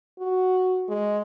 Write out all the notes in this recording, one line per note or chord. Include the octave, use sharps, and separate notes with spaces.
F#4
G#3